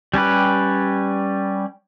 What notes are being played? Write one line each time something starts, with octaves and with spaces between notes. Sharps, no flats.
G3 C#4 G4 B4